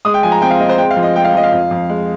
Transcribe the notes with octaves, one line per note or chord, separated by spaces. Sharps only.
G#3 D#6
G5
F3 G#5
A#5
C4 G5
F5
C4 D#5
C5
G#3 G5
F5
F3
D#5
G#3 G5
F5
F3 D#5
F5
F2
F2
G#3